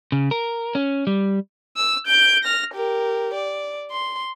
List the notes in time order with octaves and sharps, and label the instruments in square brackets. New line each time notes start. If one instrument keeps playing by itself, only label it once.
[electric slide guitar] C#3
A#4
C#4
G3
[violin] E6
G6 D7
F6 A#6
G4 A#4
D5
C6